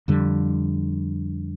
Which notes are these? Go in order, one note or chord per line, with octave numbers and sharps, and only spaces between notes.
F2 D3 G3